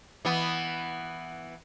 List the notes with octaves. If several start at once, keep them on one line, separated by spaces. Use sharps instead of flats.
E3 B3